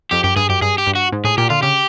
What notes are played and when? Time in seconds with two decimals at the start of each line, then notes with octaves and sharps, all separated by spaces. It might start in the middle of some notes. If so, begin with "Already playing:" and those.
0.11 F2 G4
0.24 F#2 G4
0.36 G2 G#4
0.49 F#2 G4
0.62 G2 G#4
0.78 G4
0.87 G2
0.95 F#4
1.12 G#2
1.24 A2 G#4
1.38 A#2 G4
1.50 D3 F4
1.63 C#3 G4